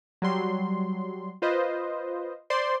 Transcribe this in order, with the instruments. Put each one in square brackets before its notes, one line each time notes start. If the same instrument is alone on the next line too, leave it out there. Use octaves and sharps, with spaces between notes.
[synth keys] F#3 G3 C6
F4 B4 C5 D#5
C5 D5 C6